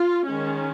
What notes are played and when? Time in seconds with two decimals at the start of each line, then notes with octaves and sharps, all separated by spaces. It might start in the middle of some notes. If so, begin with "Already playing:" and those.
Already playing: F4
0.26 D#3 G#3 C#4